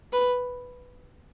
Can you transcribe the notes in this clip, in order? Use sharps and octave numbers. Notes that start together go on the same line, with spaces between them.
B4